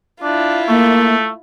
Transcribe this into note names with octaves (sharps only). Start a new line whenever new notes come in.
D4 E4 F4
A3 A#3